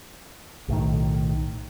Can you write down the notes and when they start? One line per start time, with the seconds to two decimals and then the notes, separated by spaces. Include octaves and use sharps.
0.68 B1 A2 D#3